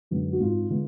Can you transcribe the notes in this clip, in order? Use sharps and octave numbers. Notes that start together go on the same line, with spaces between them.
F#2 D3 G#3 B3
F#4
G#1 F4
D3 G#3 B3